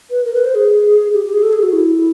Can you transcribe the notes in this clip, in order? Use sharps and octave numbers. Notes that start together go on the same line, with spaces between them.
B4
A#4
B4
C5
G#4
G4
G4
G#4
A4
G#4
F#4
E4